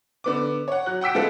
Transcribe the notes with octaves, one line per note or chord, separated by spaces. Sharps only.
D3 B3 D6
C#5 F#5
F#3 F#6
F#5 G5 E6 B6 D7
F3 G#3 B3 F4 G#4 A4